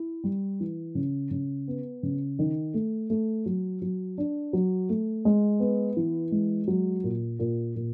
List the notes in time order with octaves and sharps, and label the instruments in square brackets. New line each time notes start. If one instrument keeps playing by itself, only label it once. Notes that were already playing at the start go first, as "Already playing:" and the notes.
Already playing: [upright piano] E4
G3
E3
C#3
C#3
B3
C#3
D#3
A3
A3
F#3
F#3
D4
F#3
A3
G#3
B3
E3
G#3
F#3
A#2
A#2
A#2